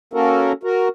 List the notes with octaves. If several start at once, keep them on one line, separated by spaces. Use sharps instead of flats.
A#3 C#4 F#4 A4 A#4
F#4 A#4